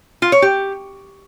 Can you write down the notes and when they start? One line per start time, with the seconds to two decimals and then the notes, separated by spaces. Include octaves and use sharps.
0.22 F4
0.32 C#5
0.42 G4